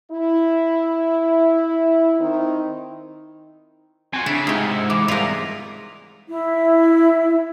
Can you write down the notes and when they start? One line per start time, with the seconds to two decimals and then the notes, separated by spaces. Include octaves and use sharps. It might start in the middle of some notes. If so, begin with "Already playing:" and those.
0.11 E4
2.20 D#3 C4 D#4
4.13 C4 F4 F#4 G#5
4.26 C#3 D4 E4
4.47 G#2 C3 D#4 F4 G#4 C#5
4.68 E4
4.90 E3 D6
5.08 C2 B3 F4 G#4 A#4
6.29 E4